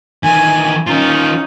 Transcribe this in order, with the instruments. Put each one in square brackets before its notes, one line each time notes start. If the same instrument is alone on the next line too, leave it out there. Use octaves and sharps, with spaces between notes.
[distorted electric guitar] D#3 E3 [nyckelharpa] G#5
[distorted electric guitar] D#3 F4 [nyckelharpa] C#4 D#4